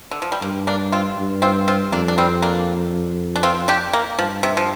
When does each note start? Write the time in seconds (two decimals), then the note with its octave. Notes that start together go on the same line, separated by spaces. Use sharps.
0.11 D3
0.22 F3
0.32 G3
0.42 G2 A#3
0.67 A#3 D4
0.92 C4 F4
1.18 G2
1.42 C4 F4
1.68 C4 F4
1.92 F2 A#3 D4
2.08 D4
2.18 G3 C4
2.42 A#3 D4
3.36 D4
3.43 C4 F4
3.68 D4 G4
3.93 A#3
4.18 G2 F3
4.43 C3
4.57 F3